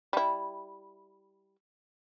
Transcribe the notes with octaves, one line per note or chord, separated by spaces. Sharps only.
G3 E4